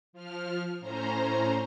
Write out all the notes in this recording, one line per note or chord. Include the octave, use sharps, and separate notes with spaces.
F3 F6
A2 C#4 C5 A#5